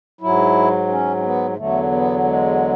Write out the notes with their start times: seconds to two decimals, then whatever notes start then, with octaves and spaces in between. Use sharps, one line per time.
0.21 G#2 F#3 E4
0.89 C#4
1.18 C#4
1.23 B3
1.56 E2 D3 F#3 A3
1.91 B3
2.25 G#3